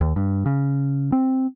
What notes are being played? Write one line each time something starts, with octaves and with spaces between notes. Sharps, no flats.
D#2
G2
C#3
C4